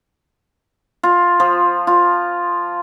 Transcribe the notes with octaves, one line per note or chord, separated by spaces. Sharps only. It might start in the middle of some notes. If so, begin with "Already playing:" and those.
F4
F3
F4